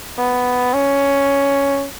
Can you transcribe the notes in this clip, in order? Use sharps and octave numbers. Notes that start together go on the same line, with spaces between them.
B3
C#4